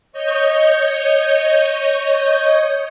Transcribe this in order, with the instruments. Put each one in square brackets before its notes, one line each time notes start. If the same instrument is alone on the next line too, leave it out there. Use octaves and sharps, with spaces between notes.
[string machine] C#5 D#5 G6